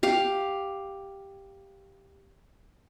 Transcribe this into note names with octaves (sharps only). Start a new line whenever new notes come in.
G4 F5